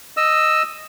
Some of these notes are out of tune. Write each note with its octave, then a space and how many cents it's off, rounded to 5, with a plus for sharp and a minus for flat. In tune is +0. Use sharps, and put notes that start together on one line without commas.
D#5 +0 E6 +0